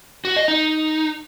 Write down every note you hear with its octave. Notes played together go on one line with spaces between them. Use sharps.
F#4
D#5
D#4